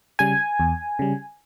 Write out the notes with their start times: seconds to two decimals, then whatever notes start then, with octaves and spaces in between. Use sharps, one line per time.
0.19 C#3 G3 G#5
0.60 E2
0.99 C#3 G3